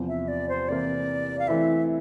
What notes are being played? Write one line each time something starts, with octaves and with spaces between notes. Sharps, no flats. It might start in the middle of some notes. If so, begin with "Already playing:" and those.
Already playing: E2 C3 F3
E5
D5
C5
C3 E3 A#3 E4 A#4 D5
F5
E3 A3 C4 E4 E5